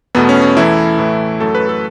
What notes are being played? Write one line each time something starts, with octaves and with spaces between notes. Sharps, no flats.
E2 B2 A3 B3
C#4
C#4
E2 E3 A3 E4
A2 E3 A3
F#2 F#3 A3 A4
B4
A4